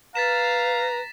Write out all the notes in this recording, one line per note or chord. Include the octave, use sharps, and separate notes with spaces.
B4 F5 A#5 A6 B6 E7